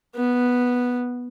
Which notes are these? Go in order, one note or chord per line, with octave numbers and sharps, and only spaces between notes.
B3